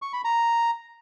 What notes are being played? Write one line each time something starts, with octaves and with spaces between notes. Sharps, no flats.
C#6
B5
A#5